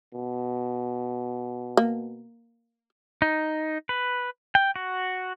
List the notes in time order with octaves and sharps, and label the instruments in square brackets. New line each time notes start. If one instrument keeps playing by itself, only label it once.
[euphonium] B2
[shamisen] A#3
[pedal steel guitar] D#4
B4
G5
F#4